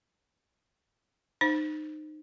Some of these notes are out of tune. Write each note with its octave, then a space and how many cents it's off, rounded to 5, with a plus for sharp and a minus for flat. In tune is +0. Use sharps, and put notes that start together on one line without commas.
D#4 -25 C5 +0